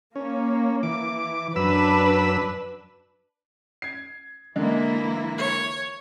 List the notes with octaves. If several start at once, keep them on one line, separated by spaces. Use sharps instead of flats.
A#3 C#4
E3 D6
F#2 D4 B4 B5 E6
G#6 C7
D3 E3 G#3 A#3 E4
C#5